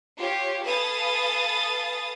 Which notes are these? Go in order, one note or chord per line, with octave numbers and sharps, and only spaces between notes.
F4 G4 C#5
A4 B4 F5 G#5 D#6 A6